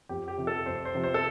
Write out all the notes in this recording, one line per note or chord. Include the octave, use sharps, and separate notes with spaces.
F2 G4
G4
C3 F3
A4
F2 C5
C5
C3 F3
C5
A4